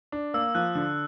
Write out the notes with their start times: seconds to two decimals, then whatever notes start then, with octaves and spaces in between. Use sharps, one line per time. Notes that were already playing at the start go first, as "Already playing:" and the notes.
0.12 D4
0.34 A#3 E6
0.55 F3 F#6
0.75 D3